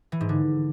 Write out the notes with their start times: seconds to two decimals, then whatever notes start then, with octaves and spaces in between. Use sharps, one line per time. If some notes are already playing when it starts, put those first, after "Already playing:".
0.12 E3
0.21 G#2
0.29 D3